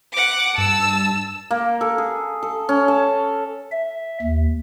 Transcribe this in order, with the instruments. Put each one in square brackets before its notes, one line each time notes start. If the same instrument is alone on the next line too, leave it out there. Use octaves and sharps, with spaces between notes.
[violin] F#5 D6
[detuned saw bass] G2 [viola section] A5 [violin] E6
[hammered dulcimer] A#3
A4
G#4
A4
C#4
A5
[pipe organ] E5
D#2